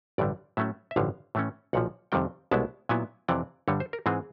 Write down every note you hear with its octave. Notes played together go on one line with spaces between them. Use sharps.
A1 G2 D3 G3 D5
A2 F#3 A3 C#4 E5
E5
A1 G2 D3 F3 F5
A2 E3 A3 C#4
B1 A#2 F3 F#5
F2 C3 D#3 G3 G5
C2 B2 G#3 B3 E4 A5
A#2 F#3 B3 E4 G#5
F2 C3 E3 D5
G2 D3 G3 C#5
C5
A#4
G#2 E3 G#3 C4 G#4